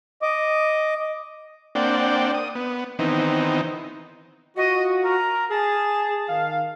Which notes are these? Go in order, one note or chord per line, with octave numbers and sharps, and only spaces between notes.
D#5 D6
A#3 C4 D4 D5 F#5 G5
D#6
B3
D#3 E3 B3 C4 D#4
F4 F#4 D#5
A#4
G#4 A5
D#3 F5